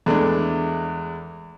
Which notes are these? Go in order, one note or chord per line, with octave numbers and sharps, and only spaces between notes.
E2 G#3 A3 D4